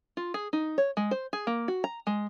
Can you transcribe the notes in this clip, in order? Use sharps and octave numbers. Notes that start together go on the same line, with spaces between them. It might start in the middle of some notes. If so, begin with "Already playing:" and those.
F4
G#4
D#4
C#5
G#3
C5
G#4
A#3
F#4
A#5
G#3